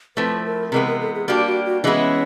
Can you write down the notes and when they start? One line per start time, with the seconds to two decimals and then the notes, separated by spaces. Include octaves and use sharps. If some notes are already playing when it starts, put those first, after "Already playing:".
0.17 F3 A3 C4 E4 B4
0.45 A#4
0.72 C3 E3 G#3 B3 A#4
0.86 A#4
1.00 A4
1.15 G#4
1.28 G3 A#3 D4 F#4 G4
1.46 F#4
1.65 F#4
1.83 E3 G#3 B3 C#4 D#4 E4